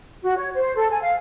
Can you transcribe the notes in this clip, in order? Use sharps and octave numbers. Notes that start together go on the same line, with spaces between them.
F#4
C#5
C5
A4
G#5
F5